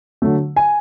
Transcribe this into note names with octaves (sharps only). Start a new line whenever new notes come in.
D3 F#3 A3
G#5